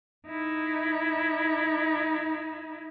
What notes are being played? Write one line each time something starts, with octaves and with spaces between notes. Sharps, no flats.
D#4 E4